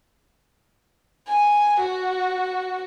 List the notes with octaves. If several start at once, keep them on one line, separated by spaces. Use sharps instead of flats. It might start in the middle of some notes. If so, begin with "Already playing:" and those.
G#5
F#4